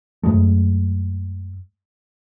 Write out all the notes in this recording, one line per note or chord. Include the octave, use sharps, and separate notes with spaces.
F#2 F#3 G#3 A3